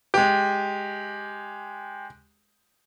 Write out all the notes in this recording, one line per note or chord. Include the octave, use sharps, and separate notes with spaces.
G#3 G4